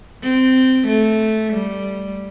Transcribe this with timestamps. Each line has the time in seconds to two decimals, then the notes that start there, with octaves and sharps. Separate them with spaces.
0.23 C4
0.88 A3
1.53 G3